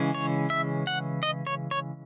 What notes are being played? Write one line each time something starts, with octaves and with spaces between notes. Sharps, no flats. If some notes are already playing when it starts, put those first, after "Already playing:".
Already playing: C#3 E3 G#3 C#4
C#5
E5
F#5
D#5
C#5
C#5